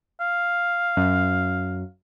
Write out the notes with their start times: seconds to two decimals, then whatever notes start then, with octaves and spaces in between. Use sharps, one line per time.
0.21 F5
0.97 F#2